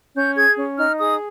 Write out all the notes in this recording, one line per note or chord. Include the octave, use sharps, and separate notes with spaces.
C#4 G6
G#4 G#6
C#4
D#4 F6
G#4 D#6